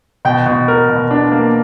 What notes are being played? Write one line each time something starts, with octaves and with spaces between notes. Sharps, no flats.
B2 G5
B2
A#4
B2
D4
A#3